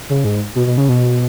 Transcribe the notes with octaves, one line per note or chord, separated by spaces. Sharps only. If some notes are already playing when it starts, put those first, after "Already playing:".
C#3
G#2
B2
B2
C#3
B2